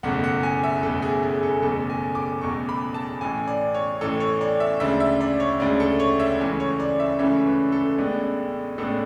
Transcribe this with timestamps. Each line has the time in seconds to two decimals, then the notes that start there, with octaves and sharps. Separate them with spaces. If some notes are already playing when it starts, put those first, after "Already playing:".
0.03 F#1 E2 B2 A3 F#5
0.24 F#5
0.43 G#5
0.64 E5
0.83 F#1 E2 B2 A3 A4
1.02 G#4
1.23 G#4
1.35 G#4
1.43 A4
1.62 F#1 E2 B2 A3 A4
1.90 G#5
2.15 D6
2.41 F#1 E2 B2 A3 C#6
2.69 B5
2.94 A5
3.21 A1 A2 E3 G#5
3.48 D5
3.75 C#5
4.01 A1 A2 E3 A4
4.20 C#5
4.41 D5
4.60 E5
4.80 D2 C#3 G#3 D4 E5
5.00 E5
5.21 D5
5.40 C#5
5.60 D2 C#3 G#3 D4
5.80 A4
6.00 C#5
6.20 E5
6.39 C#2 C#3 E3 A3 C#4
6.60 C#5
6.80 D5
7.00 E5
7.19 C#2 C#3 E3 A3 C#4 E5
7.46 B4
7.72 A4
7.98 A1 A2 G#3 B3 D4
8.78 A1 A2 G#3 B3 D4 A4